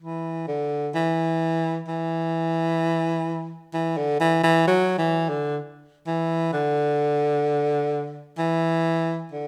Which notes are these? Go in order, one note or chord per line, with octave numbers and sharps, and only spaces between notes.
E3
D3
E3
E3
E3
D3
E3
E3
F#3
E3
D3
E3
D3
E3
D3